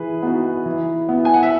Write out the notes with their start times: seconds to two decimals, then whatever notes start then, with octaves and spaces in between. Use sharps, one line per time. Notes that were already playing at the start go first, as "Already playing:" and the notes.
Already playing: E3 G#4 B4
0.22 B3 D#4 F#4
0.66 E3
1.09 B3 E4
1.25 G#5
1.34 F#5
1.43 E5